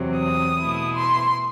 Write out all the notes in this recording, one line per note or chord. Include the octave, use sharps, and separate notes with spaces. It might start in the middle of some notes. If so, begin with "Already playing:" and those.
Already playing: E2 C3 F#3 C4
D#6
B2 A3 E4
C6